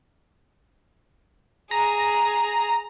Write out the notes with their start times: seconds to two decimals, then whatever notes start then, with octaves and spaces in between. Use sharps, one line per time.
1.71 G#4 A#5